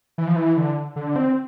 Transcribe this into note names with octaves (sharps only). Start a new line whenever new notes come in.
E3
F3
E3
D3
D3
C4